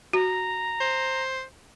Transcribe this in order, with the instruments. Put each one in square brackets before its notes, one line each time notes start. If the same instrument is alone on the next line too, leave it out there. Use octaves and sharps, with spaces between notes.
[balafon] F#4 [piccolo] A#5
[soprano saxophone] C5